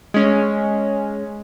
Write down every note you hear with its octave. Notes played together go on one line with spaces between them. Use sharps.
G#3 C#4